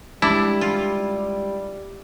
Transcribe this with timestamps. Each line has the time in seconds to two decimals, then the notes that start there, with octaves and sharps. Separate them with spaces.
0.22 G3 G#3 C#4 D4 E4
0.61 F4